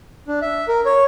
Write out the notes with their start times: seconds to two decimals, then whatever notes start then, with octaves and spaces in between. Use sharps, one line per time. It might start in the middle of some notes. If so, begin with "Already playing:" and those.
0.27 D4
0.42 E5
0.68 A#4
0.85 C#5